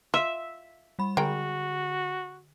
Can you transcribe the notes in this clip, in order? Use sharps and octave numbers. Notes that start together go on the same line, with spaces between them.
F4 E5
G3 B5
D3 G#3 F#4 A#4 G5